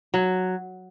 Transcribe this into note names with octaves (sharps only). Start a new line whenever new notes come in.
F#3